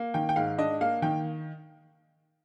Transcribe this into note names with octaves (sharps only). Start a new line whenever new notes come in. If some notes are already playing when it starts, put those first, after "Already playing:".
Already playing: A#3
D#3 G5
G5
G#2 F5
D4 D#5
A#3 F5
D#3 G5